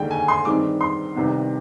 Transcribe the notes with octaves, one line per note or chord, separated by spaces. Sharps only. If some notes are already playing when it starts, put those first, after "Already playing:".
Already playing: D#2 D3 G#3 G5
G#5
C6
G2 D#3 G#3 C4 D6
C6
C2 C3 D#3 B3